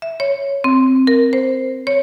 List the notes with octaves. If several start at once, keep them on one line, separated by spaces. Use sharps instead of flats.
E5
C#5
C4
A#4
C5
C#5